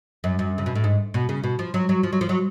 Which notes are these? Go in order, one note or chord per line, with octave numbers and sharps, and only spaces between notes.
F#2
F#2
C#3
B2
A2
G#2
B2
C#3
B2
F3
F#3
F#3
F3
F#3
F3
F#3